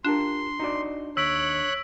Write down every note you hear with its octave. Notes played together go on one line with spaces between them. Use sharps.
D4 F4 G4 A#4 C6
D#4 F#4 D5
D#2 C#5 E6 F#6 B6 D7